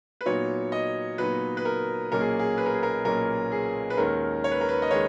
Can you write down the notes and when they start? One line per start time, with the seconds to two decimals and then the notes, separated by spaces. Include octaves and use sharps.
0.21 B4
0.26 A#2 F#3 B3 D#4 C#5
0.72 D#5
1.18 A#2 F#3 B3 D#4 B4
1.57 B4
1.65 A#4
2.12 B1 A#2 A#3 C#4 A#4
2.21 G#4
2.39 G#4
2.58 B4
2.66 A#4
2.75 G#4
2.83 A#4
3.04 B1 A#2 A#3 C#4 A#4
3.52 G#4
3.90 B4
3.97 D#2 D#3 G#3 C#4 A#4
4.44 C#5
4.52 B4
4.61 A#4
4.69 B4
4.82 D#5
4.91 D#3 G#3 C#5